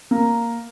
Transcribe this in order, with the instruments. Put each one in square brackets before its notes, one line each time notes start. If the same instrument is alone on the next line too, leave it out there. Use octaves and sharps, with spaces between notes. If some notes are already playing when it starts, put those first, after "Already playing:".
[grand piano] A#3